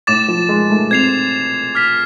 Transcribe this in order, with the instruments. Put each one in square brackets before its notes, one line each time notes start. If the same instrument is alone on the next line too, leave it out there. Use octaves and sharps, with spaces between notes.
[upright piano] A2 [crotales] D6 A6 E7
[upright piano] F3
G#3
A3
[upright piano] C4 [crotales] G#6 C7 F7
[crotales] D6 F6 B6 F7